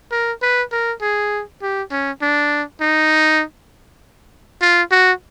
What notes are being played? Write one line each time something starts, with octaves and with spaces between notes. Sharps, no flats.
A#4
B4
A#4
G#4
G4
C#4
D4
D#4
F4
F#4